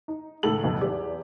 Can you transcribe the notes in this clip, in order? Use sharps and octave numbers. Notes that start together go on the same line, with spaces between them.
D#4
C#2 A2 D#3 A4 F#7
B1 F2 B2
E2 G4